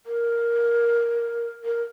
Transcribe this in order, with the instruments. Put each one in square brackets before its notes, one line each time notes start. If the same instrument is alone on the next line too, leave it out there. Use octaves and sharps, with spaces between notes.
[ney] A#4
A#4